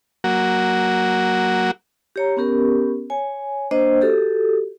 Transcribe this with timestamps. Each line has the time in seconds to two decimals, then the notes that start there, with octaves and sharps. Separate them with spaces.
0.24 F#3 A#3 F#4
2.16 G4 C#5 A#5
2.37 B3 C#4 G4 A#4
3.10 C#5 G#5
3.71 A#3 D4 C5 D#5
4.01 F#4 G4 A4